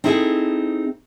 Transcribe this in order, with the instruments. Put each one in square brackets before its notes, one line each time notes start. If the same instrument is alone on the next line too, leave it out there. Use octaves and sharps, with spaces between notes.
[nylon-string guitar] C4 D#4 E4 G#4 A4